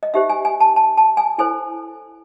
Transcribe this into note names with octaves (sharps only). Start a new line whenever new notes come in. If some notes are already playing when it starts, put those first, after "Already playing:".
D#5
D#4 G4 C5 E5
G#5
G#5
A5
A5
A5
G#5
E4 A4 C5 G#5